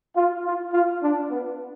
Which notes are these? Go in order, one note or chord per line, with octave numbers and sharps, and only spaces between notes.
F4
F4
F4
D4
B3